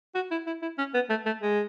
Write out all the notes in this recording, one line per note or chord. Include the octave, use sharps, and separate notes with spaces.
F#4
E4
E4
E4
C#4
B3
A3
A3
G#3